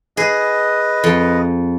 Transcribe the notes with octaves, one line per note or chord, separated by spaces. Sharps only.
G#4 B4 D#5
F2